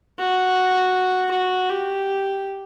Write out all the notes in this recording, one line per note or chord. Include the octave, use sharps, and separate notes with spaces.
F#4
F#4
G4